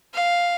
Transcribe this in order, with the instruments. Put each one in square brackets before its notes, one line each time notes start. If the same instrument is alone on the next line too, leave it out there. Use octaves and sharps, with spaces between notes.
[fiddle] F5